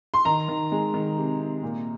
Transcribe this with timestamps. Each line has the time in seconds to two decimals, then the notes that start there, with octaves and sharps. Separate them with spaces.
0.14 C6
0.25 D#3 A#5
0.48 D#3
0.72 G#3
0.94 D#3
1.17 C3
1.39 C3
1.63 A#2